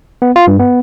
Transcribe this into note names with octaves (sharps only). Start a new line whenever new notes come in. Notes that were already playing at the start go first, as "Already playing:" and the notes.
B3
F4
G2
B3